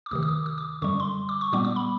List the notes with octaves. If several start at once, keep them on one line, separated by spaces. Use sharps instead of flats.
D6
D2 C3 D#3 D#6
D#6
D6
D#6
D6
F#2 D3 G3 C#6
C6
D6
C#6
A#2 G3 B3 D6
D6
B5